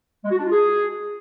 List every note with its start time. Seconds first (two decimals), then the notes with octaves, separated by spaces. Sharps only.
0.24 G#3
0.31 F#4
0.38 D4
0.45 F4
0.52 G#4